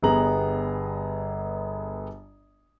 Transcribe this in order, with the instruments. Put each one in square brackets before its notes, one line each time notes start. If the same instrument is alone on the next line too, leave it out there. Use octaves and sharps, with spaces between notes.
[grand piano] G1 G3 B3 G#4 A#5 F#7